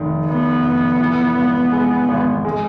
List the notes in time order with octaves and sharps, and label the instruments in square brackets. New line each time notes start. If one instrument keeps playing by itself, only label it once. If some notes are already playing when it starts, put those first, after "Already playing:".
Already playing: [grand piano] F1 D#3
[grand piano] F1 [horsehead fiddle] B3
[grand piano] F1
E3
G#1
G#3
G#1
G#3